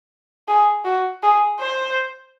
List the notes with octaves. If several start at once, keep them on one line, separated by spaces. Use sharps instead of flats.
G#4
F#4
G#4
C5